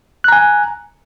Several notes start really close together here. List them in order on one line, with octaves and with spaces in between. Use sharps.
F#6 A#5 G#5